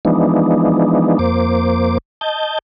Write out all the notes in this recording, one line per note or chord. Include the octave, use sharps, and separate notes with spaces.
E3 F3 G#3 B3 D4 D#4
F2 A#3 C5 D6
D#5 A5 G6